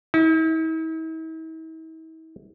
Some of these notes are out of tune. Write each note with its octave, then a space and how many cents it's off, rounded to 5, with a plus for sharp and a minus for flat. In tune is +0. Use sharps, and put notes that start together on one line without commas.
E4 -45